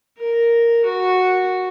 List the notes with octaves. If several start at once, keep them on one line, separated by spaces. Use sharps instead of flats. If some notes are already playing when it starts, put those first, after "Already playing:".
A#4
F#4